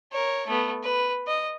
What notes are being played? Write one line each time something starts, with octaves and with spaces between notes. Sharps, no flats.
A#4 C#5
A3 B3
B4
D#5